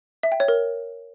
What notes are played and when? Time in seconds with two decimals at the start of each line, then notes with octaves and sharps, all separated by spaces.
0.23 E5
0.32 G5
0.40 C#5
0.48 A#4